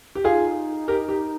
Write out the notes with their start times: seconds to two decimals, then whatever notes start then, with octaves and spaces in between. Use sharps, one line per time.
0.15 G4
0.24 D#4 F4 G#4
0.88 G4 A#4
1.09 G4